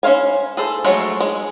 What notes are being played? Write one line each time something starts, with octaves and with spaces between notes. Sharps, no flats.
C#4 F4 C5 F5 G#5
G#4 A4 C5
F3 F#3 G#3 A3
G#3